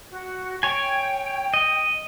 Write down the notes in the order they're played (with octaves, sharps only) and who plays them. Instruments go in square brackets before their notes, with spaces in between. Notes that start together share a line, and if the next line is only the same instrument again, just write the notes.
[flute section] F#4
[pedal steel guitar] C#5 G#5 [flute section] G5
[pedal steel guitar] D#5